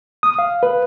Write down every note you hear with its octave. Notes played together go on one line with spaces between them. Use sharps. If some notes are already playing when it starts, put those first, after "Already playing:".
D#6
F5
B4